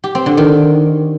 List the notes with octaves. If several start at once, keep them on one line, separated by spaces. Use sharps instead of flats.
G4
C4
D3
D#3